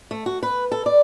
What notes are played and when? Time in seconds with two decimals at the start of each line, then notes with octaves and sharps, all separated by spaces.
0.11 A3
0.26 F#4
0.43 B4
0.72 A4
0.86 D5